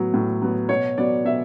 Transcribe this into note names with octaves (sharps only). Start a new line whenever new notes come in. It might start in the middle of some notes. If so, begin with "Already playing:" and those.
Already playing: A2 F#3 B3
A2
F#3 B3
B2 C#5
F#3 B3 D5
B2 E5